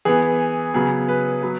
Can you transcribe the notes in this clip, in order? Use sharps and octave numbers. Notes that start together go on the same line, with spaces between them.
E3 B3 G#4
C#3 F#3 B3 G#4
B4
F#3 B3